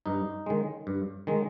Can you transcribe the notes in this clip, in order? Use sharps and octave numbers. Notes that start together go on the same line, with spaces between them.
G2 D#4
D#3 G#3
G2
D#3 G#3